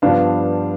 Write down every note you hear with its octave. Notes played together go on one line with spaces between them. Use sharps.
G2 F3 B3 D4 F5